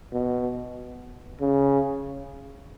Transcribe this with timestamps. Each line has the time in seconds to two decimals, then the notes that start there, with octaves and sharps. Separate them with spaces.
0.13 B2
1.41 C#3